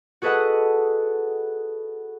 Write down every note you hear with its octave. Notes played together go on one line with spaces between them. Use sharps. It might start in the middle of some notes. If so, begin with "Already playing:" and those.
F#4 G#4 A4 B4 D#5 F#5